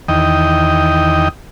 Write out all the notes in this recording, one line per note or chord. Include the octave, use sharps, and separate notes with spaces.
E2 D#3 D#5 G5